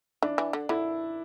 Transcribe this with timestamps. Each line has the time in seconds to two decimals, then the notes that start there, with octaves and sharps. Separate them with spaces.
0.23 E3 D4
0.38 E3
0.53 D3
0.69 D3 E4